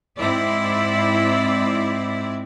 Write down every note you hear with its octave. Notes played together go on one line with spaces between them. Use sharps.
G#2 C4 E4 D5